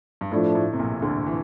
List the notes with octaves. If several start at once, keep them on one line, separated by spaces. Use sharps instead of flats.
G2
A2 F3 A3 D4
A2
C3
A#1 A#2
D2 D3
E3